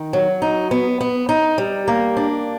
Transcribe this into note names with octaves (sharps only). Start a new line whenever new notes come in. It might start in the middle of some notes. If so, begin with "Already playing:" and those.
Already playing: D#3
F#3
D#4
B3
B3
D#4
G3
A#3
D4